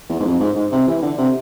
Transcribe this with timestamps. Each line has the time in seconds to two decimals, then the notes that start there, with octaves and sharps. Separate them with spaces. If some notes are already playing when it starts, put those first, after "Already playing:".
0.09 E2
0.20 G#2
0.25 F2
0.40 G#2
0.56 G#2
0.72 C3
0.87 E3
1.02 D3
1.18 C3